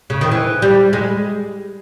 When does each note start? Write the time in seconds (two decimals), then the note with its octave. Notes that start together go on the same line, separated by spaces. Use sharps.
0.10 C#3
0.21 D#3
0.32 E3
0.62 G3
0.93 G#3